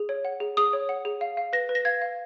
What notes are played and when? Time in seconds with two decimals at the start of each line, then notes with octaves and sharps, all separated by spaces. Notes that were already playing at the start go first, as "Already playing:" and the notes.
Already playing: G#4
0.09 C#5
0.25 F#5
0.40 G#4
0.57 G#4 D#6
0.73 C#5
0.89 F#5
1.05 G#4
1.21 F5
1.37 F5
1.53 B4 A#6
1.69 B4
1.75 A#6
1.85 F5 G#6
2.02 F5